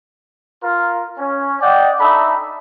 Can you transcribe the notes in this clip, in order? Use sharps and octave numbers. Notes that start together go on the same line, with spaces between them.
F4 A#4
C#4
D5 D#5 F#5 G5
D4 D#4 A4 E5 B5